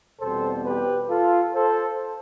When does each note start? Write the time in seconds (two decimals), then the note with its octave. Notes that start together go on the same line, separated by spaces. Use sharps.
0.21 E2 B2 G3 C4 A4 C5
0.65 G4 B4
1.10 F4 A4
1.55 A4 C5